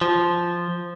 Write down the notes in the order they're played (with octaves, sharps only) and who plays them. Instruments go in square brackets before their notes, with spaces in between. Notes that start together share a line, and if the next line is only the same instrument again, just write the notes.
[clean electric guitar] F3